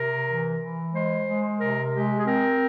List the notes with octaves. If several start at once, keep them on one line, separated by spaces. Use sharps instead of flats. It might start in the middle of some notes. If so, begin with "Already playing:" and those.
Already playing: C3 A#4
E3
E3
G#3 C5
G#3
C3 A#4
G#3 G4
G#4
C4 A#4